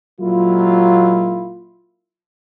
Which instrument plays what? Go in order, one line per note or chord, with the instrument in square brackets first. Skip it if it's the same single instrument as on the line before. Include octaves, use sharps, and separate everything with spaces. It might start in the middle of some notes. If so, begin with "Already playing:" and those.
[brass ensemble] A#2 F#3 G#3 A#3 E4 F4